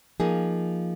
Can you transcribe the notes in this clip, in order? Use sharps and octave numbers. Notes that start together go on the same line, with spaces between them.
F3 A#3 D#4 G#4